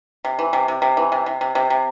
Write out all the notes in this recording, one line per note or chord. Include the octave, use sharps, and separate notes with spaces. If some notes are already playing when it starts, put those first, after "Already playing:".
C3
E3
C3
C3
C3
E3
C3
C3
C3
C3
C3